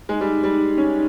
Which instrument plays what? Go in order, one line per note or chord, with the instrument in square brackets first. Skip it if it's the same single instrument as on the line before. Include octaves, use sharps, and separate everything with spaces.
[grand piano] G#3 [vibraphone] D#4
[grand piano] G3
[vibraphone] D#4
[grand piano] G3
[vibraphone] D#4
[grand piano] C#4 [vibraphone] D#4